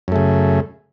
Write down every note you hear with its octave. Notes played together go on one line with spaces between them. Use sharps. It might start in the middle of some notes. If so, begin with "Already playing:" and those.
F#2 C#3 A3